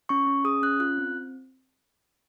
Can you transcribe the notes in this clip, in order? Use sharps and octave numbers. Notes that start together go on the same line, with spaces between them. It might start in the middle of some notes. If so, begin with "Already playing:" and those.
C#4 C#6
C#4
G#4 D#6
C#4 F#6
F4 F#6
C4